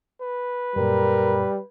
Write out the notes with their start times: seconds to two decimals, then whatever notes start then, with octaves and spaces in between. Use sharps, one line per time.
0.21 B4
0.76 F#2 A#2 G3 A#4